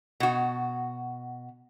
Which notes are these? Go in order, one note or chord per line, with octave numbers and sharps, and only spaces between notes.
B2 F#4